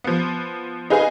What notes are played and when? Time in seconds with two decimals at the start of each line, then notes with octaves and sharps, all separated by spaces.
0.04 F3 B3
0.90 D#4 G#4 B4 F5 G#5